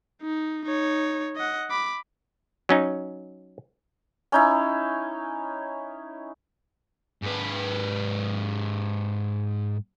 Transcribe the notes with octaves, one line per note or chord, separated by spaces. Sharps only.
D#4
D#4 C#5
D#5 F#5
B5 D6
F#3 C#4 D#4
C#4 D#4 E4
G#2 B4